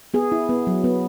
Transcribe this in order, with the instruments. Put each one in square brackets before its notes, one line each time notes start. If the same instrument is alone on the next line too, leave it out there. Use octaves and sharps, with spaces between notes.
[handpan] B3 G#4
E4
B3
F#3
B3